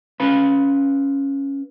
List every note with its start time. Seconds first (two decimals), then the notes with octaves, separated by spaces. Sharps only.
0.20 C#4 B4 F5 B5